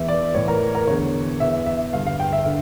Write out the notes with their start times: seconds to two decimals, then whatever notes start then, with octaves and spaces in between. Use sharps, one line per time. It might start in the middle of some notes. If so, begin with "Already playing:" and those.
Already playing: E2 E3 E5
0.08 D5
0.35 A2 E3 C#5
0.48 A#4
0.75 A#4
0.87 E2 D3 C#5
1.40 E2 E3 E5
1.66 E5
1.93 G2 D3 F5
2.06 F5
2.20 G5
2.33 E5
2.46 D3